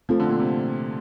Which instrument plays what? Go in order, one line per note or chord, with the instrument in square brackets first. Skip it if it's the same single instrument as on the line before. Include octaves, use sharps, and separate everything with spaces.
[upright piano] F3 [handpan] A3 C4 F4 A4
[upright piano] D3
A#2
C3